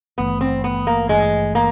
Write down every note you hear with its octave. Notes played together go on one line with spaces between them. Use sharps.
G#1 G2 E3 A3 B3
C4
B3
A#3
G#1 G2 E3 G#3 A3
A#3